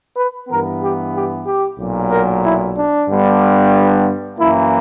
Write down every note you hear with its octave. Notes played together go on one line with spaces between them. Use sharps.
B4
G2 E3 B3 A#4
G4
G4
G4
B1 A#2 F#3
A#4
E4
D4
G2 D3 G3 B3
F#2 E3 A#3 E4